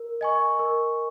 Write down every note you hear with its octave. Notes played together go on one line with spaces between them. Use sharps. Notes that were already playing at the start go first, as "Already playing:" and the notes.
Already playing: A#4
D#5 G#5 C#6
A#4